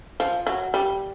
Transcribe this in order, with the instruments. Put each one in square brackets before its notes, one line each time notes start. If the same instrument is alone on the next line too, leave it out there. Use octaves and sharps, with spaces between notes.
[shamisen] F3
F#3
G3